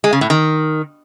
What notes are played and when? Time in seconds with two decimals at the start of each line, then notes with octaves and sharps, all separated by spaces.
0.04 G#3
0.13 C#3
0.21 A2
0.30 D#3